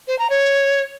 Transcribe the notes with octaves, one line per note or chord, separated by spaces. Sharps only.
C5
A#5
C#5